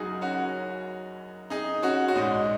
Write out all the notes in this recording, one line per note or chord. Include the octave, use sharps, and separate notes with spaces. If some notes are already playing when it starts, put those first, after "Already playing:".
Already playing: F#1 F#2 F#3 D#4 F#4 G#4
C#4 F#4
D#4 G#4
C#4 F#4
F#4
A#1 G#2 G#3 D#4